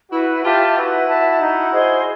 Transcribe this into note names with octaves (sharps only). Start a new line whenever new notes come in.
E4 F#4 B4
F4 G4 E5 A5
E4 F#4 B4
E5 A5
D#4
G#4 C5 D#5